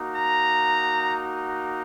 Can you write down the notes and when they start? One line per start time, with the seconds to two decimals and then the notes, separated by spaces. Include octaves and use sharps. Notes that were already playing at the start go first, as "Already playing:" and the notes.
Already playing: A#3 D#4 F#4
0.14 A#5